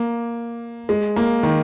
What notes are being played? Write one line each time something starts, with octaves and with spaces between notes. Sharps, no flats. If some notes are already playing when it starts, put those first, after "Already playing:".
Already playing: A#3
G#3
A#3
D#3